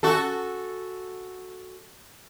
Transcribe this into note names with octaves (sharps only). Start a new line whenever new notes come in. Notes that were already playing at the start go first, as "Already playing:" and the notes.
F#4 A4